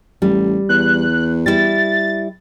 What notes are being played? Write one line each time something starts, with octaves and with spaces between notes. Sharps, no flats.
A1 G3
E2 F#6
G3 E4 A6